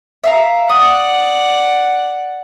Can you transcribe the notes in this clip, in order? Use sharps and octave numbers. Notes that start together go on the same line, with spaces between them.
E5 F5 A#5
D5 F#5 D#6